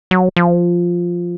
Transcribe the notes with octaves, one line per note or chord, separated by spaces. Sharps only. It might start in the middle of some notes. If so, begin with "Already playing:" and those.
F#3
F3